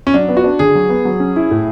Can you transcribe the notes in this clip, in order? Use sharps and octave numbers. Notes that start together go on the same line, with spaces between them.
C#4
F#3 D4
B3
F#4
D4
D3 G#4
F#3
B3
F#3
C#4
E4
A2